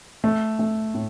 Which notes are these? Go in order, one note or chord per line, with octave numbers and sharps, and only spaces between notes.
A3
A3
A2